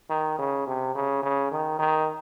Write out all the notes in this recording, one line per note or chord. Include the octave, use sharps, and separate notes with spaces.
D#3
C#3
C3
C#3
C#3
D#3
D#3